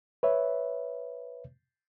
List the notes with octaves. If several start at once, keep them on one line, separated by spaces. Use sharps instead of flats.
B4 C#5 E5